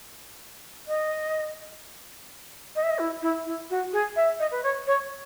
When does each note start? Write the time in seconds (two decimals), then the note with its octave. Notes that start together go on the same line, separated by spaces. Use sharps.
0.88 D#5
2.76 D#5
2.83 E5
2.90 D#5
2.99 E4
3.22 E4
3.46 E4
3.70 F#4
3.93 G#4
4.16 E5
4.39 D#5
4.51 B4
4.63 C#5
4.87 C#5